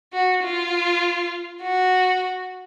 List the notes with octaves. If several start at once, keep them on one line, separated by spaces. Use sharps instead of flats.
F#4
F4
F#4